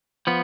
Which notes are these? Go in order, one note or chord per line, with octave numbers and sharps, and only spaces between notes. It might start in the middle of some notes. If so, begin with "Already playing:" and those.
F3 B3